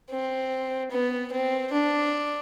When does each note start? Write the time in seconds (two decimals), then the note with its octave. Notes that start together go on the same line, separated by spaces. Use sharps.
0.10 C4
0.91 B3
1.32 C4
1.73 D4